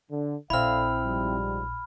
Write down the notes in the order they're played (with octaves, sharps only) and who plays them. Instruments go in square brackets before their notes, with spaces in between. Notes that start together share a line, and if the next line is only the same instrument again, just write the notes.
[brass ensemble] D3
[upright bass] A#1 [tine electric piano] C4 E4 [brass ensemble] A4 D5 F5 [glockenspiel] B5 F6
[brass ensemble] G#2 F3 G3